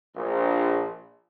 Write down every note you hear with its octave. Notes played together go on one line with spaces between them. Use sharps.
A#1